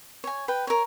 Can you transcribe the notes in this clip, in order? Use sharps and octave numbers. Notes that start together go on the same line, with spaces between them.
C#5 G#5
B4 G5
A#4 C#5